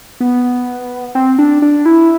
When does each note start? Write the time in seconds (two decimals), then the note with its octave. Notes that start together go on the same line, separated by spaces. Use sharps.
0.20 B3
1.15 C4
1.39 D4
1.62 D4
1.86 E4